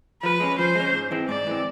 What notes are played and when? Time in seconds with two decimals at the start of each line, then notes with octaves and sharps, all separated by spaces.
0.23 F3 B4
0.40 G#3 C#4
0.58 F3 C5
0.75 G#3 C#4
0.94 G#2
1.11 E3 G#3 C4
1.29 G#2 D5
1.47 E3 G#3 C4